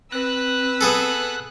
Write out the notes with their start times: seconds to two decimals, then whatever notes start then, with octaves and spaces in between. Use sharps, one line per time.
0.12 C4 B4 E6 F#6
0.81 B3 G#4 A4